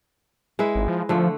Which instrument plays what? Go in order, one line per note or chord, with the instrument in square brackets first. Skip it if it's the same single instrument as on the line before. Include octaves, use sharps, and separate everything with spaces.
[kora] G#3 E4 B4
[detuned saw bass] G#1
F3
[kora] D3 A3 [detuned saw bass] F3